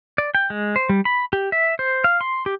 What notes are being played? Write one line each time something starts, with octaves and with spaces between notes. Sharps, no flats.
D5
G5
G#3
C5
G3
B5
G4
E5
C5
F5
C6
G4